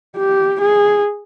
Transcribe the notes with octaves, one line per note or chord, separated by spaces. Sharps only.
G4
G#4